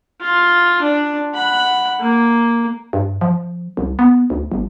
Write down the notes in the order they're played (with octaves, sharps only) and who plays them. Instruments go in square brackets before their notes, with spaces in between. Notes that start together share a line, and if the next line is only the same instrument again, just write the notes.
[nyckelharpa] F4
D4
F#5 B5
A#3
[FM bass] G2
F3
C2
B3
D2
G1